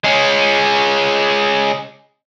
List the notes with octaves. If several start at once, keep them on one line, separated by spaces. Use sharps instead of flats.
G#3 C#4